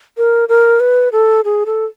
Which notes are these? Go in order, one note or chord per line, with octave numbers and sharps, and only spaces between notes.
A#4
A#4
B4
A4
G#4
A4